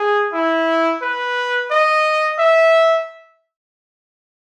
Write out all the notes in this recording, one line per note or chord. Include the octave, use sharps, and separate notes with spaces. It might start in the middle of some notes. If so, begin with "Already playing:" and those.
Already playing: G#4
E4
B4
D#5
E5